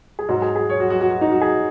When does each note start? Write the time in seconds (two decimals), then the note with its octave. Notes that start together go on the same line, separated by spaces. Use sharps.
0.19 G#4
0.28 G#2 F#3 F#4
0.42 G#4
0.56 G#4
0.70 C#5
0.80 F#4
0.90 F#4
1.01 F#4
1.11 F#4
1.21 D#4
1.32 F#4
1.41 G#4